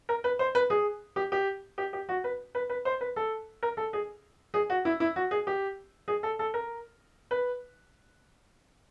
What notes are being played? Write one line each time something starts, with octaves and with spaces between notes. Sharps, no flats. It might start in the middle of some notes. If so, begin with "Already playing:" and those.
A#4
B4
C5
B4
G#4
G4
G4
G4
G4
F#4
B4
B4
B4
C5
B4
A4
A#4
A4
G#4
G#4
F#4
E4
E4
F#4
G#4
G4
G#4
A4
A4
A#4
B4